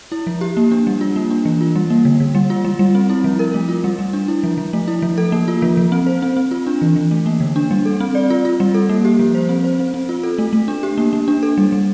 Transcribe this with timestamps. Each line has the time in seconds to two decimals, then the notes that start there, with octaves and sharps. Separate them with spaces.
0.12 E4
0.27 F3
0.41 G4
0.57 A#3
0.71 D4
0.87 G3
1.01 F4
1.16 A#3
1.30 D4
1.45 E3
1.61 F4
1.75 G3
1.90 A#3
2.05 D3
2.20 D3
2.35 G3
2.50 F4
2.65 G3
2.79 G3
2.95 C4
3.10 E4
3.24 F3
3.39 A#4
3.54 A3
3.69 F4
3.84 G3
3.99 G3
4.13 D4
4.28 E4
4.43 F3
4.57 F3
4.73 A3
4.88 E4
5.02 F3
5.18 A4
5.32 A#3
5.48 F4
5.62 F3
5.77 F3
5.92 C4
6.07 C5
6.22 C4
6.37 C4
6.51 F4
6.67 D4
6.81 E3
6.96 E3
7.11 A3
7.26 A#3
7.40 D3
7.56 D4
7.71 G3
7.85 A4
8.00 C4
8.15 D5
8.30 F4
8.45 F4
8.60 G3
8.74 A4
8.89 A#3
9.05 G4
9.19 F3
9.35 C5
9.49 C4
9.64 C5
9.79 C4
9.94 C4
10.09 F4
10.23 A4
10.38 A3
10.53 A3
10.68 D4
10.83 G4
10.98 A#3
11.13 A#3
11.28 D4
11.43 A4
11.58 G3
11.72 G3